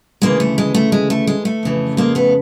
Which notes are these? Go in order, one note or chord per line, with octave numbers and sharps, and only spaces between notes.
D2 C#3 E3 G#3 A#3
A3
G#3
A3
G#3
A3
G#3
A3
F2 C#3 E3
G#3 A#3
A3 B3